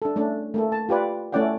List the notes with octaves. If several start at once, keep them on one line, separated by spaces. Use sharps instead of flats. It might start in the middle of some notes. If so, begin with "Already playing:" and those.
D4 A4
A3 C#4 D4
A3 A#3 A4
A5
F4 G4 B4 D5
A3 C#4 E4 D5 F#5 G5